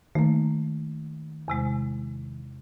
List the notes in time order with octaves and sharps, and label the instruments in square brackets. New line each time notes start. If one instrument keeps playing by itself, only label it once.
[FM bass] D#3 [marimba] A3 A#3
[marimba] E2 C3 G#3